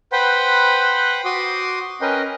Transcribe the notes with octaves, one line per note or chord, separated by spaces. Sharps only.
B4 C5 F#5 G5 B5
F#4 C6 D6 D#6
C#4 A#4 B4 D#5 G5